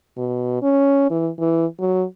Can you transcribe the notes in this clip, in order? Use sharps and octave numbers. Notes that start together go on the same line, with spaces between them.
B2
C#4
E3
E3
F#3